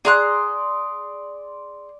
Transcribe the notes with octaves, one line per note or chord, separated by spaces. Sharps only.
G#4 D5 A#5 C6 F#6